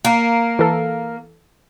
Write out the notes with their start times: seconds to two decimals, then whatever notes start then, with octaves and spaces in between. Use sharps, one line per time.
0.05 A#3
0.59 E3 A4